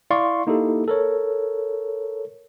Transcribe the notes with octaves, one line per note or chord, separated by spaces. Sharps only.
E4 D5 F5 C6 C#6
A#3 D#4 E4 G4 A4
A4 A#4 C#5